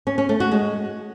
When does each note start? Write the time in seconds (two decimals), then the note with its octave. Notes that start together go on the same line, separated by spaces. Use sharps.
0.07 C#4
0.18 C#4
0.29 A3
0.40 F#4
0.51 G#3